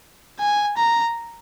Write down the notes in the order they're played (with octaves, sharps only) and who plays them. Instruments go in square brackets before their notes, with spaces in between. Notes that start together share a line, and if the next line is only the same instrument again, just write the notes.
[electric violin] G#5
A#5